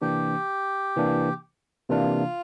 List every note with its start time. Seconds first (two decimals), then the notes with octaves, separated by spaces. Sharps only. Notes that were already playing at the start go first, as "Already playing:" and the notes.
0.02 C3 E3 A#3 D4 G4
0.96 C3 E3 A#3 D4
1.89 C3 E3 A#3 D4 F4